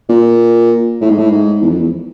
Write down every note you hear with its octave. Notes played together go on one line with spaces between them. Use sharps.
A#2
A2
G#2
A2
G#2
E2
F2
E2